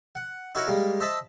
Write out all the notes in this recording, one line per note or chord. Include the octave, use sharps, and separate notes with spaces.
F#5
D#4 E4 F#4 A#4 C#5
G3 G#3 A#3
C5 D#5 E5 A5 B5